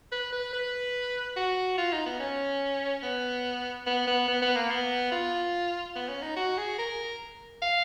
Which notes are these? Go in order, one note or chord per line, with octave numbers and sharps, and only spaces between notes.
B4
B4
B4
F#4
F4
D#4
B3
C#4
B3
B3
B3
B3
B3
A#3
B3
F4
B3
C#4
D#4
F#4
G#4
A#4
F5